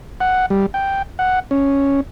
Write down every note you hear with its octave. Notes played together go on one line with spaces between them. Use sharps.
F#5
G3
G5
F#5
C#4